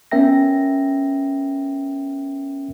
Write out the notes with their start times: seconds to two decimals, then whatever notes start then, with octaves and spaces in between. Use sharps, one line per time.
0.11 B3 C#4 A#4 E5 G5 A#6